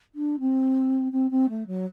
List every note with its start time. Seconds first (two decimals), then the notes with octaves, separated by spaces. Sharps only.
0.15 D4
0.40 C4
1.12 C4
1.31 C4
1.49 A3
1.67 F#3